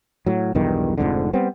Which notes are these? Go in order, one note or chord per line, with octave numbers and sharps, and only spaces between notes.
A2 F#3
B1 E2 G2 D#3
F1 F2 G#2 D3
G3 B3 C4